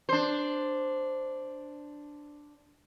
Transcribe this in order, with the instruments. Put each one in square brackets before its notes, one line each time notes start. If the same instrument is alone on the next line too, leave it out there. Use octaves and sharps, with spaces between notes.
[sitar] D4 C5